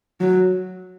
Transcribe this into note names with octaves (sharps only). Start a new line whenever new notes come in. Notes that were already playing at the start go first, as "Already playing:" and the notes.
F#3